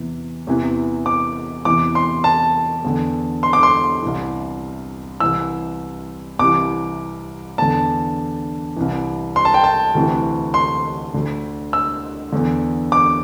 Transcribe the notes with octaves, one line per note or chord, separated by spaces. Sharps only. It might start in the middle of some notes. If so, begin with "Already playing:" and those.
Already playing: E2 C3 E3
E2 C3 E3
D6
E2 C3 E3 D6
C6
A5
E2 D3
C6
D6
C6
C2 C3 E3
C2 C3 E3 E6
C2 C3 E3 D6
E2 D3 A5
C2 C3 E3
C6
A5
G5
A5
D2 C3 E3
C6
D2 D3
E6
E2 D3
D6